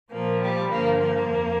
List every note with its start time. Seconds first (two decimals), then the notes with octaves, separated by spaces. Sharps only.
0.11 A#2 F3 A#3
0.41 G3
0.70 G2 D3 F3 A#3
1.00 A#3
1.29 F2